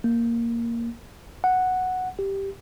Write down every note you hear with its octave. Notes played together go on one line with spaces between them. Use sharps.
A#3
F#5
G4